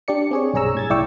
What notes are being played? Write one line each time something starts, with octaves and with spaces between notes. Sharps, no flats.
D4 G4 D5 C#7
C4 G#4 C#5
B1 G2 G#4 C#5 A#5 E6
A2 G#6 A6
C2 E4 D5 G5 C#6 E6